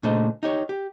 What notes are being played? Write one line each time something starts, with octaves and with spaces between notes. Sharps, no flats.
A#2 C#3 A3 D4 C5 D#5
D#4 G4 C#5
G4